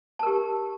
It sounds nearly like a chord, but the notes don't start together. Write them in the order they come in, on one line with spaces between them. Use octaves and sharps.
A5 A#4 G4